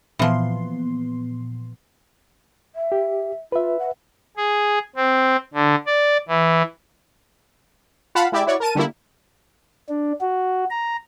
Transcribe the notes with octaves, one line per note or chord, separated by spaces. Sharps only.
A#2 E3 F3 B3 C6
E5
G4
F4 B4 E5
F#5
G#4
C4
D3
D5
E3
F4 F5 F#5 A5 B5
G#3 E4 G4 D5 E5
E4 F#4 C#5 D5
A#4 A5 D#7
D3 G3 A3 A#3 E4
D4
F#4
A#5